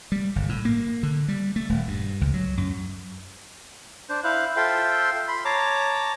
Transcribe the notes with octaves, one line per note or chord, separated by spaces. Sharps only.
G3
G1
A2
A#3
D3
G3
A3
D#1
G2
C#2
F#3
F#2
D4 C5
E4 C5 F5 F#6
F4 A4 C5 E5 G5 C6
B5 C6
C#5 A5 A#5 D6